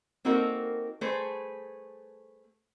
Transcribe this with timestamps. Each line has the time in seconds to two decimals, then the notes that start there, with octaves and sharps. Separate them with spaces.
0.25 A#3 C4 D#4 F#4 A4 A#4
1.01 A3 G#4 B4 C5